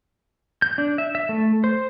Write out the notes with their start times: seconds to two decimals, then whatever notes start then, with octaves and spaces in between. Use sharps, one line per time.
0.62 G6
0.78 D4
0.98 E5
1.15 E5
1.29 A3
1.64 C5